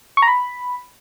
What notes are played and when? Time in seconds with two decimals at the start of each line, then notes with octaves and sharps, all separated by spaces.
0.17 C#6
0.22 A#5
0.28 B5